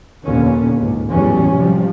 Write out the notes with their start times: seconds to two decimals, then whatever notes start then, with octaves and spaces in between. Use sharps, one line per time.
0.25 F1 D#2 A#2 D3 B3 C#4
0.78 C#2 G#2
1.11 A1 E2 F#3 G3 C#4
1.56 C3 F3 G3